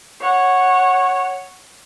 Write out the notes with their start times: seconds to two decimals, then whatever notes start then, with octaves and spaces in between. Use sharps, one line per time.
0.20 C#5 F#5